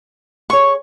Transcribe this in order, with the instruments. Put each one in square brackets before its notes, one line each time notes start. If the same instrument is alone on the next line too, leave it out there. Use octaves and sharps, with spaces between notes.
[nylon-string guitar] G#4 C#5 [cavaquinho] C#6